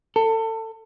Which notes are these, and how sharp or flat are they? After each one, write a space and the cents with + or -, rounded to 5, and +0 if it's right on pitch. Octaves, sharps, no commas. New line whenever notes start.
A4 +25